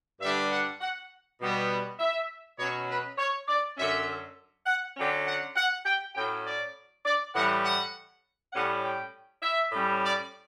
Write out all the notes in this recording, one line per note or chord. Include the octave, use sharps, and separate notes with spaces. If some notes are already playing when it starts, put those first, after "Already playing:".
G2 D3 G3 D4 E5
F#5
F#5
B2 G3 B3
E5
B2 F#3 C#4 C#5
B4
C#5
D5
F#2 D3 F#3 C#4 E5
F#5
D3 F#3 C#4 G5
F#5
F#5
G5
A2 F#3 C#4 G5
D5
D5
A2 E3 G3 F#5
F#5
A2 G3 C#4 F#5
G5
E5
A2 G3 C#4
D5